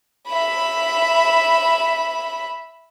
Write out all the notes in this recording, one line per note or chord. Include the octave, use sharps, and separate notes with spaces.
E5 B5